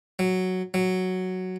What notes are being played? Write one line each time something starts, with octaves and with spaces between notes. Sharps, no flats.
F#3
F#3